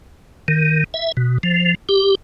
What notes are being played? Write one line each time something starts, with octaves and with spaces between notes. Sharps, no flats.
D#3
E5
B2
F3
G4